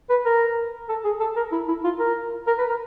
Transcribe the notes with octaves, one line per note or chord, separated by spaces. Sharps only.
B4
A#4
A4
G#4
A4
A#4
E4
E4
F4
A#4
A#4
B4
A#4